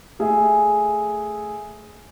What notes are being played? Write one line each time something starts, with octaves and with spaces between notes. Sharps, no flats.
A3 G#4 E5